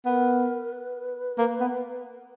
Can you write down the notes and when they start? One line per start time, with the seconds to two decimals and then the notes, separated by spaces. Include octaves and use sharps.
0.05 B3 A#4
0.72 B4
1.38 A#3
1.60 B3